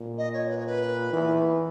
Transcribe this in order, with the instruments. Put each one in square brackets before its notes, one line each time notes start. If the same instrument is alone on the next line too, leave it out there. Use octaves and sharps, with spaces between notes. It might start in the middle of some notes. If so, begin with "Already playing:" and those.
Already playing: [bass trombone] A#2
[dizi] D#5
C#5
B4
C#5
B4
[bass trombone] E3